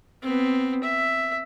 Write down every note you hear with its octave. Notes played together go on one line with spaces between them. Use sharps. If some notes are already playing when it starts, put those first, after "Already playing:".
B3 C4
E5